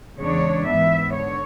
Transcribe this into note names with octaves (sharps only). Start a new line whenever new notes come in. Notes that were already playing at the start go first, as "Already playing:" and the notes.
E2 C#3 G#3 D4 C#5
G#2 E3 B3 E5
D3 C#5